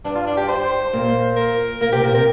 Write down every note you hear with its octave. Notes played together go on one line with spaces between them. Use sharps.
G2 G3 D4
F4
D4
G4
C5
A#2 A#3
A#4
A#2 A#3 A#4
C3 C4 G4
A#2 A#3 A#4
C3 C4 A#4